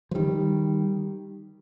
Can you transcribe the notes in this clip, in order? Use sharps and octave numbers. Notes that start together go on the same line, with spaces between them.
F3
D#3 G3